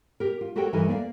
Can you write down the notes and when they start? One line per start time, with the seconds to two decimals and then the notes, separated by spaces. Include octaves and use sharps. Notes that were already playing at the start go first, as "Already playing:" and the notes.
0.20 G4 A#4
0.41 F4
0.56 F#4 G4 A4 A#4 C#5 G5
0.73 G2 E3 D#4 A4 A#4 G#5
0.89 A#3 D5 E5 F5